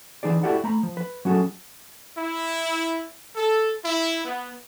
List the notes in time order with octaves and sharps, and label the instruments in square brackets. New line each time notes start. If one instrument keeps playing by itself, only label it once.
[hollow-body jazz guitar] E3 D#4 G#4 D5
E4 F#4 G4 A4 D5 F#5
A3 A#5 B5
F3
B4
F#3 C#4 F#4 G#4 A4
[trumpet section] E4
A4
E4
B3